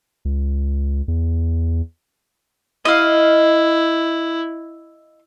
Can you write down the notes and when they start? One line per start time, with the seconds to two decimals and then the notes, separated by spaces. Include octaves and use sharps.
0.25 C#2
1.08 E2
2.85 E4 D#5 F5